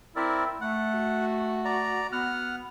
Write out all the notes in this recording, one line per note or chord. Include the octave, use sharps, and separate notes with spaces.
C4 E4 A#4 D5
A3 F#5
F#4
D5 A#5
B3 F#5 F6